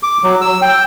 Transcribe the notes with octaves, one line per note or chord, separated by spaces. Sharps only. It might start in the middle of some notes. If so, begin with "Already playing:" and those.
D6
F#3
E6
G5